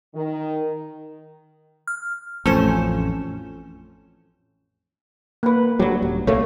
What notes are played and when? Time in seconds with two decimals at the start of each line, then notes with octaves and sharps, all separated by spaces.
0.15 D#3
1.87 F6
2.46 A1 F2 A3 C#4 A4 C5 G#5 E7
5.43 A#3 B4
5.79 D2 F#3 G3
6.02 D#1
6.27 C2 A3 A#3 C#5